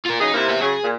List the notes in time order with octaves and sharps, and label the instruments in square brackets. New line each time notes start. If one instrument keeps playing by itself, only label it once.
[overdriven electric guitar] F4 A#4
[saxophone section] C#3 F#3 G#4 [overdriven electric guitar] D#4
[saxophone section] C3 A#3 [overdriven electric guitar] E4
[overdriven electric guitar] B3 E5
[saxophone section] C#3 F#3 [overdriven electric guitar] G#4
[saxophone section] A#2